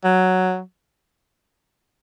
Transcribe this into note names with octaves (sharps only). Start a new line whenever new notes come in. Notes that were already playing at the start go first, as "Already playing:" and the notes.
F#3